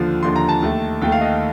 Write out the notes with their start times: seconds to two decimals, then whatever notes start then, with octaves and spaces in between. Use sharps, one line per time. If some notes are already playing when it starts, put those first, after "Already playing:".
Already playing: D#2 D3 F3
0.23 D#2 D3 F3 C6
0.36 A#5
0.49 A5
0.63 D#2 D#3 A3
1.02 D#2 D#3 A3 G5
1.12 F5
1.21 D#5